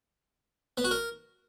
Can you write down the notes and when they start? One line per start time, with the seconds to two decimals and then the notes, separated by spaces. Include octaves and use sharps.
0.77 B3
0.84 F#4
0.91 A#4